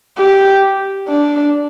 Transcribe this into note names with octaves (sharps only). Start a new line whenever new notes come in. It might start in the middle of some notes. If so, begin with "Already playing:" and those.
G4
D4